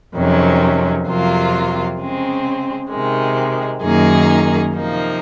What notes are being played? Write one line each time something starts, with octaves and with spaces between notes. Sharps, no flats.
F2 C3 D#3 F#3 C#4
F2 C3 F#3 A#3 F4
C#3 G#3 C4
C3 D#3 G#3
F#2 D#3 A#3 D#4 G#4
C3 F3 A#3 D#4